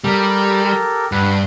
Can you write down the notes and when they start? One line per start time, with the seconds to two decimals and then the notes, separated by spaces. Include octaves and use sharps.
0.04 G3 G4 A4 A#4
1.12 G2 B4 F#5